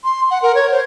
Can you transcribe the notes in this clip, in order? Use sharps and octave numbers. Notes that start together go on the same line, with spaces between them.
C6
F#5
A#4
C#5
C5